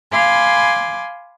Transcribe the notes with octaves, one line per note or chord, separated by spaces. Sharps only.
F5 G#5 B5 C6 D6